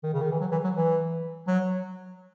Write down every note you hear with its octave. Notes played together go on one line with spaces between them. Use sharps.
D#3
C#3
D#3
E3
F#3
E3
F#3
E3
F#3